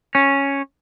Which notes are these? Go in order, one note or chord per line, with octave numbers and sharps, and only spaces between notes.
C#4